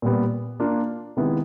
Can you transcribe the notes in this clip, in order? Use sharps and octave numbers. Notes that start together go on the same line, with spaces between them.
A#2 G3 B3
A#3 D4 F4
C3 D#3 G#3 B3 E4